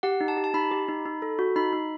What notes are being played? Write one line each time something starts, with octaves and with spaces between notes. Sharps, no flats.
G4 F#5
D#4
A5
G4
A5
D#4 B5
G4
D#4
D#4
A4
F#4
D#4 B5
D#4